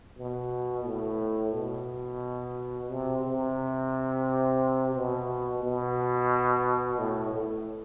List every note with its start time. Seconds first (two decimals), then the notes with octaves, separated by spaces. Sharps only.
0.18 B2
0.87 A2
1.54 B2
2.91 C3
3.25 C3
4.95 B2
5.63 B2
6.99 A2
7.34 A2